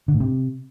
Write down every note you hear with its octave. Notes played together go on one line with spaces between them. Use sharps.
D3
A2
C3